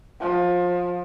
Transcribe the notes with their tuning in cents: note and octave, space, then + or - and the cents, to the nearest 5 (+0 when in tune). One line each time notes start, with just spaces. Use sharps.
F3 +25